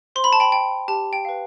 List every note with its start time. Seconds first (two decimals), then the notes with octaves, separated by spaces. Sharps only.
0.16 C5 C6
0.24 B5
0.33 A5
0.40 G5 B5
0.52 G5
0.88 G4 A5
1.13 G5
1.25 B4 F5